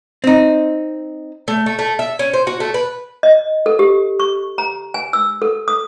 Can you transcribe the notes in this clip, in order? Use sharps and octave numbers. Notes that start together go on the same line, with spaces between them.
C4 D#4
A3
A3
A3
E5
C#4
C5
F#4
A3
B4
D#5
A4
G4
C#6
A#5
G#5
E6
A4
D#6